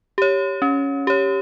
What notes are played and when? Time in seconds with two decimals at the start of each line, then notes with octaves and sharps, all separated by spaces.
0.18 G4 C#5
0.62 C#4
1.07 G4 C#5